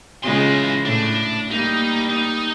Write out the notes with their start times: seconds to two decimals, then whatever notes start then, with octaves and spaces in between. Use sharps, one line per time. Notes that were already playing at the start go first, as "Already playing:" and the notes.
0.23 C#3 E3 G#3 F4 C6
0.85 A2 D4
1.51 G3 A#3 D#4
2.09 D#4